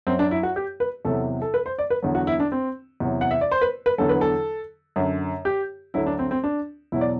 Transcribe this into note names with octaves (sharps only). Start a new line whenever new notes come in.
F#2 F#3 C4
D4
E4
F#4
G4
B4
E2 C3 F#3 A4
A4
B4
C5
D5
B4
E2 D3 F#3
F#4
E4
D4
C4
E2 C3 F#3
F#5
E5
D5
C5
B4
B4
E2 D3 F#3 A4
B4
A4
F#2 D3 F#3
G4
D2 D3 F#3 E4
D4
C4
C4
D4
E2 B2 F#3 E4
D5